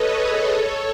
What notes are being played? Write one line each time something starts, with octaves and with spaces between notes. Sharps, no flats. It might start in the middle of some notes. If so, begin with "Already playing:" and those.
Already playing: A4 B4 C#5 D#5
G#4 B4
A4 C#5